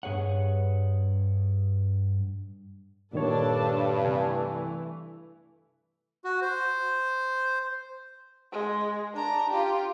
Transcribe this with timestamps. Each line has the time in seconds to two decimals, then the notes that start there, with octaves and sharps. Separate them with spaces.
0.03 G2 G#4 C#5 F#5
3.13 G2 A#2 D#3 D4 A4 C#5 A5
4.02 C3 E3 A3 G#5
6.24 F#4
6.42 C5
8.52 G#3
9.14 D4 A#5
9.49 F4 G4